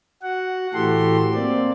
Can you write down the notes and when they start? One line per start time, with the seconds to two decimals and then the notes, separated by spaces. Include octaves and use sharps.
0.23 F#4 F#5
0.74 A2 E3 F#4 G4 A4 C6
1.34 A#3 C4 D5